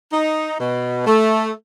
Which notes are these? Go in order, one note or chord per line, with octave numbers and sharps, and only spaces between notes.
D#4
B2
A3